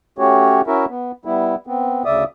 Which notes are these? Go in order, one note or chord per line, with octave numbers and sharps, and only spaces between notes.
A3 C#4 F#4 G4 C#5
C#4 E4 F#4 A#4 E5
B3
G3 B3 E4
B3 C4
D2 C#3 D5 E5 D#6